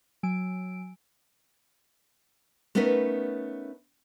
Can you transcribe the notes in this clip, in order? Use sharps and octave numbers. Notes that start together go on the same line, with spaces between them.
F#3 G#5 E6 D7
A3 B3 C#4 D#4 A#4 B4